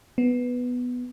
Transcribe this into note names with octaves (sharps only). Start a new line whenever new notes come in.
B3